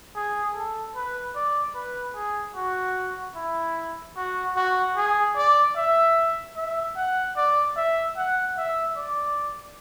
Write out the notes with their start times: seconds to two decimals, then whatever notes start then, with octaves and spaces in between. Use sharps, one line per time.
0.16 G#4
0.55 A4
0.96 B4
1.35 D5
1.75 B4
2.15 G#4
2.56 F#4
3.36 E4
4.17 F#4
4.56 F#4
4.97 G#4
5.36 D5
5.76 E5
6.56 E5
6.96 F#5
7.37 D5
7.77 E5
8.17 F#5
8.58 E5
8.97 D5